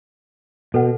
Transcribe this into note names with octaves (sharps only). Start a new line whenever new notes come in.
B2 A4 B4 F#5